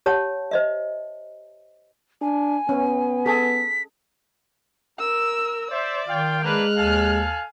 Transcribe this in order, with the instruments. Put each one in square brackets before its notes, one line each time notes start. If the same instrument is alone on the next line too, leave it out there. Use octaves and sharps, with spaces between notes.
[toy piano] G4 C#5 F#5 A5
C5 D#5 E5
[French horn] D4 [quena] G#5
[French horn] B3 [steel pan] C#4
[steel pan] G#4 A4 [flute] B6
[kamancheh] A#4 E6
[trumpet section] C5 E5 [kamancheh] D5
[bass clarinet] D#3 [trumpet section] F4 F5 G5
[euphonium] G#3 [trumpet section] A#3 D4 B4 [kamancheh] F6 F#6
[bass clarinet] D#2 [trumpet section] A4 F5 G#5